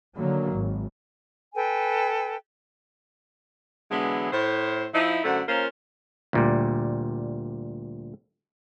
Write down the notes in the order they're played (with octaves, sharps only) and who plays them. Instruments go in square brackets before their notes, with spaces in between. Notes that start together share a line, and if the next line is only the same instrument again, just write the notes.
[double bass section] D3 D#3 F#3 A#3
G#1
[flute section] A4 B4 G5 G#5
[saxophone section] D3 E3 F#3 G#3 B3
A2 C5
F3 D#4 E4
F#2 D3 A3 C5 F#5
A#3 C#4 F4 A#4 C5
[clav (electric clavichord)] D2 A#2 G3